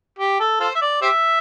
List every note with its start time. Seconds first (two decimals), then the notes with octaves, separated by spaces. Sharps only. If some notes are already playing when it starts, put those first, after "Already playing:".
0.19 G4
0.40 A4
0.60 F4 A4 C5
0.75 E5
0.81 D5
1.02 G4 C5 E5